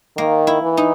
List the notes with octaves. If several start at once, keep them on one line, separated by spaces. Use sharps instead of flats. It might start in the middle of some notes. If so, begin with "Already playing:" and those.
D#3 A#3
E4
E3
D#4